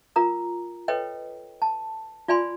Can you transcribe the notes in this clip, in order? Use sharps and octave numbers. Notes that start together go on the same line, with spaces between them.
F4 A#4 A#5 D#6
A4 B4 C#5 D#5 G5
A5
F4 D5 G#5 B5 C6